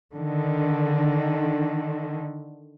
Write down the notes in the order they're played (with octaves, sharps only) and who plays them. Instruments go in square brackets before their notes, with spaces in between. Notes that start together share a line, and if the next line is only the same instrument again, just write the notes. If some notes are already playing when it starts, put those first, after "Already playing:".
[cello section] D3 D#3